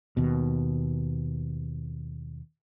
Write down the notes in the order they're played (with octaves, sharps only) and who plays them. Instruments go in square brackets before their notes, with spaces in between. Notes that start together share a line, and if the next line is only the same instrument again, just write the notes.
[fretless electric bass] D#2 B2